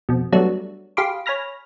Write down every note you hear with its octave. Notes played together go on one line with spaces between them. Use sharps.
F2 B2
F#3 G3 A3 B3 D4
G4 G#4 F5 B5 C6 D6
C#5 G#5 B5 F6 A#6